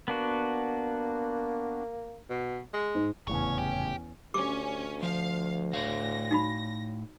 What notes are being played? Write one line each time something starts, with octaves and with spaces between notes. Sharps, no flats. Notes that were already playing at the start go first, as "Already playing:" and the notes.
A#3 B3 D4 F#4
B2
G#3
G#2
F1 E2 A2 C#3 C#4 C#5
G4
D2 C#4 G4 D6
F3 F5
A2 C#5 F5 A#6
D#4 F#4 B5